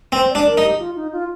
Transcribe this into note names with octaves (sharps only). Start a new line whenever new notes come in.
C4 C5
D5
D4
A#4
D#4
G4
F4
D#4
F4